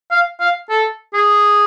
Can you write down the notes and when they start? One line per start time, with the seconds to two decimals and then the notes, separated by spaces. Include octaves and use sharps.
0.11 F5
0.40 F5
0.70 A4
1.14 G#4